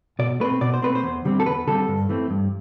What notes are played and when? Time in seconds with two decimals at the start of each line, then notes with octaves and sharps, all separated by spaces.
0.19 B2 D5
0.40 A3 B4
0.44 C4
0.61 B2 D5
0.74 C5
0.82 A3 C4 B4
0.95 C5
1.03 E2
1.25 D3 G3 C4
1.40 A4
1.46 E2 B4
1.67 D3 G3 C4 A4
1.88 G2
2.09 E3 A3 C4
2.30 G2